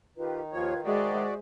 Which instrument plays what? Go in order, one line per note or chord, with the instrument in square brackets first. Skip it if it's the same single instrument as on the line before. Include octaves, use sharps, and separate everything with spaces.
[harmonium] D#3 D#4 [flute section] F4 G4 B4
[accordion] D#2 F3 C#5 [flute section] F4 B4 G#6
[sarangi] G#3 [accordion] F#4 D5 [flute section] G#4 C5 E5